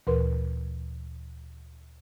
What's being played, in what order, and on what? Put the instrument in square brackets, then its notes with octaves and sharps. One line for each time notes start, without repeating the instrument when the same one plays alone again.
[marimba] D2 A#2 E3 A#4 B4 C6